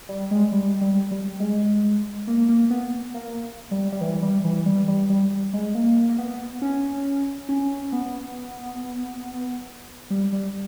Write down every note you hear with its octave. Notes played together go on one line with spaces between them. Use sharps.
G3
G#3
G3
G3
G3
G#3
A#3
A#3
B3
A#3
G3
G3
E3
G3
E3
G3
G3
G3
G#3
A#3
A#3
B3
C#4
C#4
B3
G3
G3